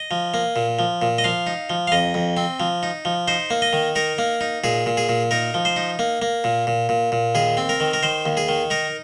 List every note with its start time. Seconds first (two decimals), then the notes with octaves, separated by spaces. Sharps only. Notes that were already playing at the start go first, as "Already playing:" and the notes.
Already playing: D#5
0.11 F3
0.34 A#3
0.56 A#2
0.79 F3
1.02 A#2
1.18 D#5
1.24 F3 F5
1.47 D#4
1.70 F3
1.87 F5
1.92 F2 D#5
2.14 F2
2.37 C4
2.60 F3
2.83 D#4
3.05 F3
3.28 D#4 C5
3.50 A#3
3.62 D#5
3.73 D#3
3.95 D#4 A#4
4.18 A#3
4.41 D#4
4.64 A#2 G#4
4.86 A#2
4.97 G#4
5.09 A#2
5.31 D#4 A#4
5.54 F3
5.65 C5
5.76 D#4
5.99 A#3
6.22 A#3
6.44 A#2
6.67 A#2
6.89 A#2
7.12 A#2
7.35 D#2 G#4
7.57 C4
7.69 A#4
7.80 D#3
7.93 A#4
8.03 D#3 C5
8.25 D#2
8.37 G#4
8.48 D#3
8.70 D#4 A#4